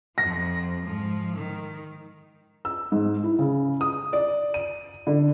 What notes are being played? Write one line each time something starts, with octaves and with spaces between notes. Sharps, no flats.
F2 F3 A#6
G#2 F3
D#3
E6
G#2
E4
C#3
D#6
D5
D#7
D3